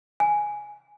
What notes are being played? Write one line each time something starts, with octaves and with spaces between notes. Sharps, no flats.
G#5